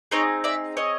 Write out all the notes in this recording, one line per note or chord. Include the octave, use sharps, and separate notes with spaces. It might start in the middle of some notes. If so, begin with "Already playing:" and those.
C4 D#4 G#4 C#5 D#5
D5 E5
C#5 D#5